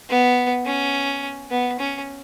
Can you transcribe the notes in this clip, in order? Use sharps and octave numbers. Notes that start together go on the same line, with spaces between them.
B3
C#4
B3
C#4